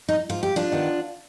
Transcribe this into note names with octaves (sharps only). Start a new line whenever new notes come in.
D#4
G#2 F4
G4
D4 F4
D#3 B3